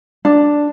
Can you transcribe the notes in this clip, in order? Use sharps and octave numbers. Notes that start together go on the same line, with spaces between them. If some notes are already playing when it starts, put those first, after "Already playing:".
D4